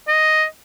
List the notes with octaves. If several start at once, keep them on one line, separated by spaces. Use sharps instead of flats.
D#5